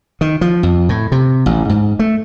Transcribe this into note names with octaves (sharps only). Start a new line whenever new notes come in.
D#3
F3
F2
A2
C3
A1
G#2
A3